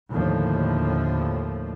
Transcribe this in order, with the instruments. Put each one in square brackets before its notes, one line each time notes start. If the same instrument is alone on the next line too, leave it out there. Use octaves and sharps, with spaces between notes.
[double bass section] D#2 A2 D3 F3